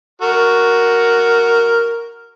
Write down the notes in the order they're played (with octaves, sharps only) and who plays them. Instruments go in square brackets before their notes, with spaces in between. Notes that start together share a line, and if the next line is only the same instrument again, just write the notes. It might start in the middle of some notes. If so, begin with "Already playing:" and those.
[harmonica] F#4 A#4